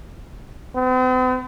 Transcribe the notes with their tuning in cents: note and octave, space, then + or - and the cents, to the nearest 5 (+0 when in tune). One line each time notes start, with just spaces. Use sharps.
C4 -45